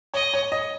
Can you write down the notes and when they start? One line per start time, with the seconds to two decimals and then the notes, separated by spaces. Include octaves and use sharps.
0.14 C#5 D#5
0.34 C#5
0.52 D#5